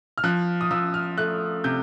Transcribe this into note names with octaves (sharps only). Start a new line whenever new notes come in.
F6
F3 F#6
D#6
F3 E6
F6
A3 F#6
C3 G6